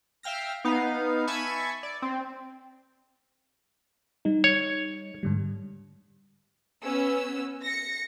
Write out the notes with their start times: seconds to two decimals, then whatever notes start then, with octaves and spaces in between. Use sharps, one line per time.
0.23 E5 F5 G5 F6 A#6
0.65 B3 D#4 F5
1.27 E5 G#5 A5 B5 C#6 G#6
1.83 D5
2.02 C4
4.25 G3 D#4
4.44 C#5
5.23 G#2 D3 G3
6.82 B3 C#4 E6
7.64 A#6 C#7